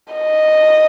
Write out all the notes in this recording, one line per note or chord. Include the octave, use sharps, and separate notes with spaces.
D#5